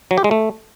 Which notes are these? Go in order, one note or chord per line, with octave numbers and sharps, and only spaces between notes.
F#3
G4
G#3
A3